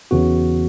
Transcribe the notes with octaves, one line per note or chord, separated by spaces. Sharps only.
E2 C#3 E3 B3 F#4